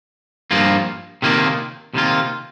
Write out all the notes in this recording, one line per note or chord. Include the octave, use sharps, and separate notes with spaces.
G2 F3 A#3 F4
C3 D#3 A#3 F4
C3 D#3 A#3 F4